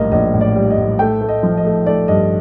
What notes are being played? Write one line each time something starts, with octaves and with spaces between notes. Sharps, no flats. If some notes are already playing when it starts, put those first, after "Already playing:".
Already playing: A#1 A2 G3 A#3 D#5 F5
A#1 D#5
A2
D5
G3
D#5
A2
A3 G5
A3
D#5
F3
D#5
A3
A3 D5
G2 D#5